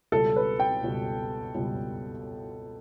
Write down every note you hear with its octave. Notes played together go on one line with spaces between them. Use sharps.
C#2 B2 G3 A4
B4
G5
C#2 B2 G3
C#2 B2 G3